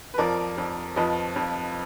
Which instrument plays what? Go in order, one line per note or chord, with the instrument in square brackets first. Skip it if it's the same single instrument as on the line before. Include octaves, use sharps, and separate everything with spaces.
[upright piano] B4
F2 F3 A#4 D5
F2 F3
F2 F3 B4 D#5
F2 F3